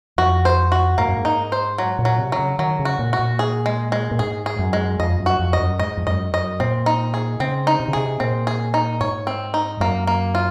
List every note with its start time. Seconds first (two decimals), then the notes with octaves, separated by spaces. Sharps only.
0.18 F2 F#4
0.45 C5
0.72 F#4
0.98 G#2 A#3
1.08 F#2
1.17 G#2
1.25 D#4
1.52 C5
1.78 F#3
1.99 A#2
2.05 F#3
2.18 C3
2.32 F#3
2.39 C#3
2.59 D#3 F#3
2.79 C#3
2.85 F#4
2.99 A#2
3.13 F#4
3.19 A#2
3.39 G#4
3.66 G#3
3.92 G#3
4.11 A#2
4.19 G#2 G#4
4.46 G#4
4.59 F#2
4.73 G#3
5.00 F2 D#5
5.20 F#2
5.26 F#4
5.39 F2
5.53 D#5
5.59 F#2
5.79 G#2 D#5
5.97 F2
6.07 F#2 D#5
6.33 F#2 D#5
6.60 A#2 C4
6.86 D#4
7.14 G#4
7.40 C#3 C4
7.67 D#4
7.80 C3
7.88 C#3
7.93 C3 G#4
8.20 A#2 C4
8.47 G#4
8.74 D#4
9.00 G#2 C#5
9.27 C4
9.54 D#4
9.80 F#2 A#3
10.07 A#3
10.35 F4